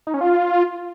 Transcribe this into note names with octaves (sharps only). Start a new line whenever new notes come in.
D#4
C#4
F4